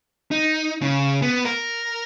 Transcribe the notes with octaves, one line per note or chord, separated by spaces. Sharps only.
D#4
C#3
B3
A#4